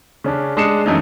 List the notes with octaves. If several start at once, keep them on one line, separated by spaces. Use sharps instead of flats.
C#3 C#4 D4
G#3 D4 D#6 C7 C#7 E7
F#2 E3 A3 D#4